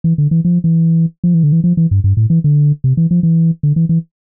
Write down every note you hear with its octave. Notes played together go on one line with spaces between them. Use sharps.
E3
D3
E3
F3
E3
F3
E3
D3
E3
F3
E3
G2
G2
A2
E3
D3
C3
E3
F3
E3
D3
E3
E3